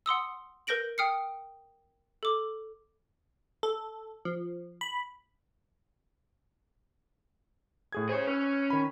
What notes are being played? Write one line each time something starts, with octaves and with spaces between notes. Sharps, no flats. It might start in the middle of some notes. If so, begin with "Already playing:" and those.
F#5 C6 D#6 E6
A#4 B4 G6 A#6 D7 F#7
G5 D#6 F6 C7 C#7
A4 D6
A4
F3
B5
A2 G#4 G#6
G#4 C5 C#5
C#4 B4 E6
D#3 B5